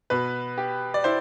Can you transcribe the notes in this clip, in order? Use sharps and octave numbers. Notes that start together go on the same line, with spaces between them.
B2 B4
G4
D5
E4 C5